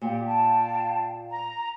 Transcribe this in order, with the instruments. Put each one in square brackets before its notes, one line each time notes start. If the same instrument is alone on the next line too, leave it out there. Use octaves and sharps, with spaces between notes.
[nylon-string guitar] A#2 [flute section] G4
[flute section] F5 G5 A5
A#5